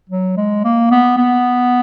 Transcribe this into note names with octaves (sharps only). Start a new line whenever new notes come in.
F#3
G#3
A#3
B3
B3